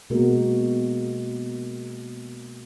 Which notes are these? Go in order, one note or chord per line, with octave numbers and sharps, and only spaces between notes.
B2 G#3 A#3 F#4 A#4